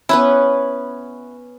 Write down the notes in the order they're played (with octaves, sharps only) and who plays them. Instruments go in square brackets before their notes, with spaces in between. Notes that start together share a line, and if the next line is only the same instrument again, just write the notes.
[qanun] B3 C#4 [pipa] E4 B4